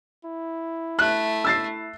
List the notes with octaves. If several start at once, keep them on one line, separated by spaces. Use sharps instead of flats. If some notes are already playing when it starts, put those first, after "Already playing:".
E4
A3 F#6
E6 A6 C7